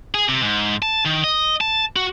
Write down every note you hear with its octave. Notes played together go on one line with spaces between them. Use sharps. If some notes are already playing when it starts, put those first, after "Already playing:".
G#4
C3
G#2
A5
D#3
D#5
A5
F#4